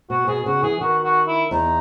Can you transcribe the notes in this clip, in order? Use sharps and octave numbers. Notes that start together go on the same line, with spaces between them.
B2 F#4
B2 G#4
C#3 F#4
E3 G#4
D#3 F#4
F#4
E4
E2 D#4